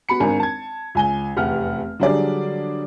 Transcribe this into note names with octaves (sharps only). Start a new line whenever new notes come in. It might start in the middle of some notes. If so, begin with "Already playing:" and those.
B3 F#4 B5 C#7
G#1 D4 A#4 G#5
A5 G#6
C#2 G#5 G7
F1 E2 B3 G4 F#5 F6
D3 F#3 G3 D4 G#4 D5